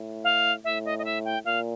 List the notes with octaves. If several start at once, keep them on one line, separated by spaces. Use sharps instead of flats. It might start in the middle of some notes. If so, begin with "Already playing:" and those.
Already playing: A2
F5
A2 E5
D#5
D#5
E5
G5
A#2 F5